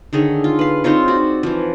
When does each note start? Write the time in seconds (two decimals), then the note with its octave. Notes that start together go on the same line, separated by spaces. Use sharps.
0.13 D3 D#3 G#4 C#5
0.44 F4
0.59 B4 F5
0.84 C4 D#4 F4 C#5
1.08 F#4 D5
1.43 E3 F3